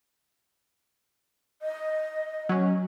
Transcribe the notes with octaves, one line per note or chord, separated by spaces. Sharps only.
D#5
F#3 C#4